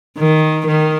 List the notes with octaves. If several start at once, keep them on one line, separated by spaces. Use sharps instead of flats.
D#3
D#3